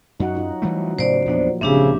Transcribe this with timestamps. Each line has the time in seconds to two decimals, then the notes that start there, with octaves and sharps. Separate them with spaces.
0.20 F#2 D#4 F#4 F#5
0.35 F#3 D#4 F4
0.62 E3 G3 A3
0.99 A2 C#3 F#3 C5 D5
1.26 E2 A#2 F3 B3 D4
1.61 A#1 G#2 C#3 C4 D4 G4 E5